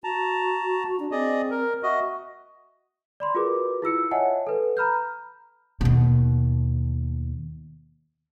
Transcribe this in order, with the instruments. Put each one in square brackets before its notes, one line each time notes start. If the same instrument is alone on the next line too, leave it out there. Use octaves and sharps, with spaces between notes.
[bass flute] F#4 [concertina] A5 A#5
[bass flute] D4
[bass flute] C4 [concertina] G#4 D5 D#5
[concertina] A#4
[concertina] F#4 D#5 [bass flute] E5
[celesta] D5 B5 C6
F4 F#4 G#4 A#4 B4 D6
E4 F4 E6 C#7
C#5 D#5 E5 F#5 G#5 A5
A4 B4
A#5 B5 F6 G6
[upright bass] D#2 B2